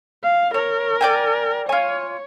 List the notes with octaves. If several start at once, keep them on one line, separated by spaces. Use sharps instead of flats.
F5
A#4 C#5
D5 G5 G#5
F4 C#5 G#5